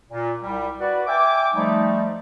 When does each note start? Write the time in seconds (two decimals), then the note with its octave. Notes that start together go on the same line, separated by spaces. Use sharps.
0.10 A#2
0.42 C2 G3
0.79 F#4 B4 D5
1.07 E5 G5 G#5 D6
1.54 F3 G3 A3 D#4